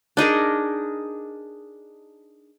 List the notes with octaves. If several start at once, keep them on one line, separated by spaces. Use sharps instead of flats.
D4 D#4 G#4 A#4